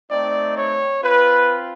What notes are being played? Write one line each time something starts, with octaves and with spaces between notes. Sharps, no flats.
A3 C4 D#4 D5
C#5
C4 F4 B4